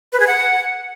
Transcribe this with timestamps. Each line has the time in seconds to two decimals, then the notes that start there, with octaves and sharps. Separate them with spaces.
0.13 B4
0.20 G#4
0.27 F#5